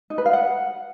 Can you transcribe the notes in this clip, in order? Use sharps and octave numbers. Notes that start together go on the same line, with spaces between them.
D#4
B4
F5
F#5